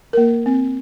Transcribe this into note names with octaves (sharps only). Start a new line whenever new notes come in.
A#3 A#4
C4